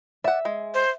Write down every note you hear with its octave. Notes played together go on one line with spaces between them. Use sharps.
D5 E5 F#5
G#3
C5